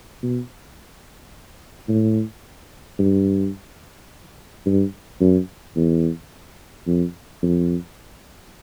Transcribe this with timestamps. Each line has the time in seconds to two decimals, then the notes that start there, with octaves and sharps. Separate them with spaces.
0.23 B2
1.88 A2
2.99 G2
4.66 G2
5.21 F#2
5.76 E2
6.87 F2
7.42 F2